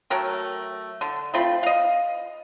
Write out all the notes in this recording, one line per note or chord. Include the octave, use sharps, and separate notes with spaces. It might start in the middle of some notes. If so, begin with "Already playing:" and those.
F#3 A3 A#4 G5
D3
A3 C4 F4 B5
D#5 F5